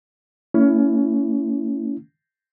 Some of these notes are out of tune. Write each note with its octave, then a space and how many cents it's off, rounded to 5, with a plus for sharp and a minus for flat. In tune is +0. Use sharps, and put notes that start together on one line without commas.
A#3 -40 C#4 +25 E4 +5